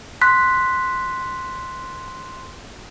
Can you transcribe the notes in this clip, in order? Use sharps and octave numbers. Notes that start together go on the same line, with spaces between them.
C6 F#6 B6